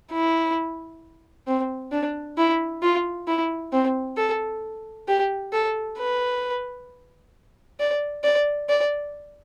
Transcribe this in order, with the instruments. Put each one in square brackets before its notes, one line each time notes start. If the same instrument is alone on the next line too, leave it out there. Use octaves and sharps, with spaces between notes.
[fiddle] E4
C4
D4
E4
F4
E4
C4
A4
G4
A4
B4
D5
D5
D5